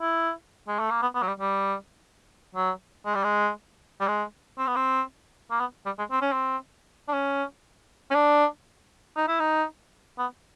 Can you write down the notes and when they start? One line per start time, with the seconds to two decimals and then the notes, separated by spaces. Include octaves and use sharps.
0.01 E4
0.68 G#3
0.79 A3
0.91 A#3
1.02 B3
1.15 B3
1.22 F#3
1.27 G3
1.40 G3
2.55 F#3
3.06 G#3
3.15 G3
3.24 G#3
4.00 G3
4.08 G#3
4.59 C4
4.67 B3
4.76 C4
5.51 A#3
5.60 B3
5.86 G3
5.99 G#3
6.11 C4
6.22 C#4
6.33 C4
7.08 D4
7.13 C#4
8.11 C#4
8.15 D4
9.16 D#4
9.28 E4
9.40 D#4
10.19 B3